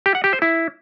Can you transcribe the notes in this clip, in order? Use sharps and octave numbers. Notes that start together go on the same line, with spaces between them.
G4
F#5
G4
C5
E4